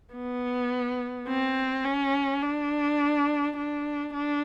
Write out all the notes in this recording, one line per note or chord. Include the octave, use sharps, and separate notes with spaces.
B3
C4
C#4
D4
D4
D4